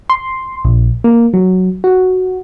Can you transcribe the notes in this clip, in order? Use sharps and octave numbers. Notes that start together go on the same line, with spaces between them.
C6
A#1
A#3
F#3
F#4